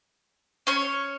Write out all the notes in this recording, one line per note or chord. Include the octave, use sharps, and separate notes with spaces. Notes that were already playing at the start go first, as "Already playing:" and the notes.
C#4 C#5